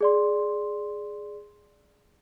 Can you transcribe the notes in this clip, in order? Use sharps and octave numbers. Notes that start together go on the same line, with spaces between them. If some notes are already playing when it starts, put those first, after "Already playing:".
G#4 D5 C6